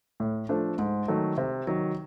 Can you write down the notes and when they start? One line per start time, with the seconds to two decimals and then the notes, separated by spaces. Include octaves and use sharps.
0.20 A2
0.49 F3 A3 D4
0.79 G#2
1.08 D#3 F#3 A3
1.38 C3
1.67 D#3 F#3